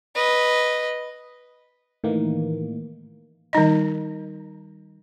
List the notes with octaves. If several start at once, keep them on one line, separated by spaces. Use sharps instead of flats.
B4 D#5
A2 D#3 E3 A#3
D#3 G3 D#4 D#5